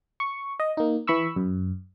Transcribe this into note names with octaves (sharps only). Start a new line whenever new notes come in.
C#6
D#5
A#3 D#4
E3 B5 C#6 E6
F#2